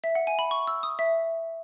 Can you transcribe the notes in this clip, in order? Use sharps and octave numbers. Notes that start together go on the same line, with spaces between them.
E5
F#5
G#5
B5
C#6
E6
D#6
E5